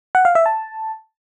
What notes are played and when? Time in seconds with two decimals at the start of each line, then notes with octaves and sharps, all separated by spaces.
0.15 F#5
0.25 F5
0.35 E5
0.46 A5